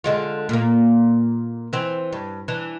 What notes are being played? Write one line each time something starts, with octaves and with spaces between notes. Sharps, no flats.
D3 G#3 F4
A#2 A#3
E3 C4
G2
E3 D4